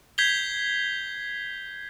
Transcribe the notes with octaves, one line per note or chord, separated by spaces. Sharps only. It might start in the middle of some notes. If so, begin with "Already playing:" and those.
G6 G#6 B6 C7 F7 G7